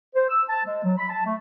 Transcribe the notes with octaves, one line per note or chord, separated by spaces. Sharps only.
C5
E6
A5
G#3
F#3
B5
A5
A3